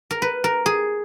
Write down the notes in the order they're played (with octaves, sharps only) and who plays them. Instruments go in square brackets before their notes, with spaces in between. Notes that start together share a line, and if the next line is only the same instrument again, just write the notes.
[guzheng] A#4
B4
A#4
G#4